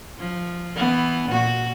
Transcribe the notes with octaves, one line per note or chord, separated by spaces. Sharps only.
F3
E3 B3
A#2 F#4